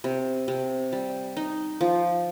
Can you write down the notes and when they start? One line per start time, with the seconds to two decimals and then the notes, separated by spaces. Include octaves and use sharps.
0.04 C3
0.48 C3
0.93 G3
1.37 D#4
1.81 F3